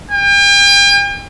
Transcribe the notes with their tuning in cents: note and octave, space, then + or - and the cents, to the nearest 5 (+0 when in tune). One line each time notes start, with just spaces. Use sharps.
G5 +40